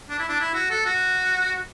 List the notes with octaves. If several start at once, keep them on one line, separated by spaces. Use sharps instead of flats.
D4
E4
D4
E4
F#4
A4
F#4